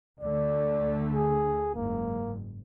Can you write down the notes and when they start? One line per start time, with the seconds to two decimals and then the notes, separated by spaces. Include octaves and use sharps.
0.21 D2 D3 A3 D5
1.15 G#4
1.75 F#1 G#2 A#3